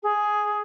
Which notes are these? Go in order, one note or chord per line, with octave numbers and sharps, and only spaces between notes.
G#4